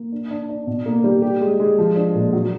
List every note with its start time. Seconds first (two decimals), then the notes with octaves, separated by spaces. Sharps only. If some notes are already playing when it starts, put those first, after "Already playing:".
Already playing: A#3
0.12 D4
0.31 D4
0.49 D4
0.67 B2
0.86 A#3
1.04 G3
1.22 G4
1.41 G#3
1.60 G#3
1.78 F3
1.96 D4
2.14 A#2
2.33 F#3